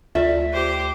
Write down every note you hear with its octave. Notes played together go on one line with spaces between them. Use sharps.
D2 F4 A4 D5 E5
G4 C5